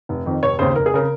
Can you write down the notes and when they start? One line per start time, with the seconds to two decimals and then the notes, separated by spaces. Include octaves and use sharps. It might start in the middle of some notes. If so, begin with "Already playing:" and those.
0.09 F1
0.26 F2 D#3
0.43 F1 C#5
0.59 D#2 C#3 C5
0.76 F1 A#4
0.86 G#4
0.94 C#3 A#4